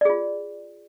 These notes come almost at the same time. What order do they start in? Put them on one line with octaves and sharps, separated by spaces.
D5 G#4 F4